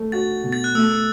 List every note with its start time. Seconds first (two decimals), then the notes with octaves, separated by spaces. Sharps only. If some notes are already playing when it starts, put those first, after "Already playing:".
Already playing: A3
0.12 F#4 A6
0.44 B2
0.52 A6
0.64 F#6
0.75 A3 E6